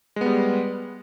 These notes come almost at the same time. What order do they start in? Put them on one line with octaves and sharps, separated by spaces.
G#3 B3 G3